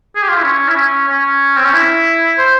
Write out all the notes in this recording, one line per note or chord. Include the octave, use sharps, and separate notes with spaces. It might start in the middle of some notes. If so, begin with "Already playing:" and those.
G#4
G4
F4
E4
C#4
E4
C#4
C#4
C4
C#4
E4
C5